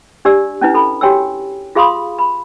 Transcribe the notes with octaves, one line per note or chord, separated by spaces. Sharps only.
D4 G4 D5 E6
C#4 D4 E4 B4
A4 B5
F#4 G4 C#5 G5 G#5 E6
F4 G#4 F5 B5 C6 D#6
B5